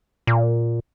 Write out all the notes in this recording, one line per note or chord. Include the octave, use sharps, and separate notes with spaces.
A#2